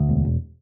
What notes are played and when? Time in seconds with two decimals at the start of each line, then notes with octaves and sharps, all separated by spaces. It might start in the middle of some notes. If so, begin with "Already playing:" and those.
Already playing: D2
0.09 E1
0.25 E1